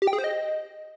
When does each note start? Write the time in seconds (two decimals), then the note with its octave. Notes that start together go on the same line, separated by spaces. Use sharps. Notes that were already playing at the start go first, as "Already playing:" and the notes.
0.02 G4
0.07 G5
0.13 G#4
0.19 C5
0.24 D#5